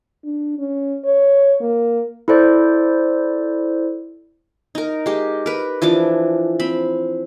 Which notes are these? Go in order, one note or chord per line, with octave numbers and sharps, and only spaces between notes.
D4
C#4
C#5
A#3
E4 A4 C5 D5
D#4 A#4
G#3 G4
A#4 B4
E3 F3 D4 D6
C4 B5